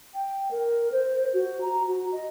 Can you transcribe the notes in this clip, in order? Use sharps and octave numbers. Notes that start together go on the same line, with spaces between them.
G5
A#4
C5
F#4
A#5
F#4
D#5